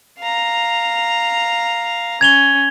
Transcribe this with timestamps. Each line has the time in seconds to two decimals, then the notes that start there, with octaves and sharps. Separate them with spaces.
0.19 F5 A#5
2.21 C#4 G#6 F7 G7